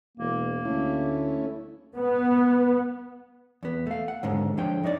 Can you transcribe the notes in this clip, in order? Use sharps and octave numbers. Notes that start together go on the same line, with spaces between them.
E1 A#3
D2 A3 C#4 E4
B3
E2 B3
A3 F5
F#5
D#2 G#2 D3 G#3
D3 F3 D4 C#5 G5
F2 D#4 C#5 D5